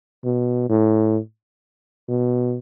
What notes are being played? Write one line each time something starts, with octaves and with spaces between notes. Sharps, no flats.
B2
A2
B2